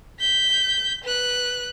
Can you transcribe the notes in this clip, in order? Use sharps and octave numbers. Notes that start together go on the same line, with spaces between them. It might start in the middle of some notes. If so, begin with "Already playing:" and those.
G6 B6
B4 F#6